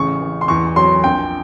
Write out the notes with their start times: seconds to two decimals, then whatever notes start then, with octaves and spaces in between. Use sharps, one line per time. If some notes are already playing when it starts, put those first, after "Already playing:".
Already playing: A1 C#3 C#6
0.21 A1
0.41 C6
0.48 E2 C#6
0.76 F#3 C6
1.04 A#1 G5